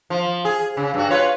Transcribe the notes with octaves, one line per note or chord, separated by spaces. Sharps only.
F3
G#4
C#3
G2 F#4
F4 B4 C#5